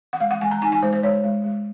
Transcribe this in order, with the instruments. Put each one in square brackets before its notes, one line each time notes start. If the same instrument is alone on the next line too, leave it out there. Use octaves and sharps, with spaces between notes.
[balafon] F#5
G#3 F5
F#5
G#3 G#5
A#5
D#4 G#5
G#5
G#3 C5
C5
G#3 C#5
G#3
G#3